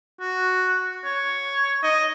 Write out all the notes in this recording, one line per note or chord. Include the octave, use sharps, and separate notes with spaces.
F#4
C#5
D#5